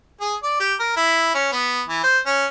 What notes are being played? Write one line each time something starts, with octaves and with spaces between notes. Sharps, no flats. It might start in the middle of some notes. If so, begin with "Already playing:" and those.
G#4
D5
G4
A#4
E4
C#4
B3
E3
C5
C#4